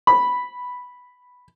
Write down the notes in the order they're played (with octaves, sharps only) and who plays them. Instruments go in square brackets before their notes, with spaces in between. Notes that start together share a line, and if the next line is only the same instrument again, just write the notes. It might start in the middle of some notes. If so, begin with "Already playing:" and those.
[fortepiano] B5